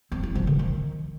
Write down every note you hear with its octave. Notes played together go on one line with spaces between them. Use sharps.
C4
E4
F3
D3
D#3